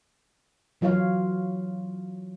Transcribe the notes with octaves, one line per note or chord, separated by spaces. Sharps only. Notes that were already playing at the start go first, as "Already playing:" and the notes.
E3 F#3 F4 C#5 F5